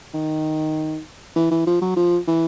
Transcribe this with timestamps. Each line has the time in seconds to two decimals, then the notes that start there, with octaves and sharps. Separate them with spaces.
0.14 D#3
1.36 E3
1.51 E3
1.67 F3
1.81 F#3
1.96 F3
2.27 E3